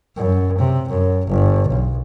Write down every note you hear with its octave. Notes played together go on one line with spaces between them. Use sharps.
F#2
C3
F#2
G1
B1